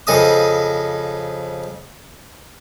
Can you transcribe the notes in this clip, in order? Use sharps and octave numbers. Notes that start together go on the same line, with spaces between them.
F2 C#3 D#5 D#6